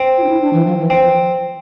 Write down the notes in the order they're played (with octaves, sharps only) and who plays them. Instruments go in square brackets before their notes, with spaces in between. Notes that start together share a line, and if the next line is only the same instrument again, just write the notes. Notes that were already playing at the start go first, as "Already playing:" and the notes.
Already playing: [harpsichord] C4
[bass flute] F4
D4
E4
D4
E3
F3
E3
[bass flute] F3 [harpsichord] C4
[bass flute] F3